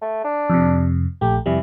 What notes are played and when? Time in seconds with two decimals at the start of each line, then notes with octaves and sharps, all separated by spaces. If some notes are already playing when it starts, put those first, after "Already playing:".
0.02 A3
0.24 D4
0.50 F2 C3
1.21 A#1 A3 G4
1.46 F2 C3 E3 G3